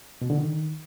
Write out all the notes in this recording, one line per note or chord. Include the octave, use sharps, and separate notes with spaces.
B2
D3
D#3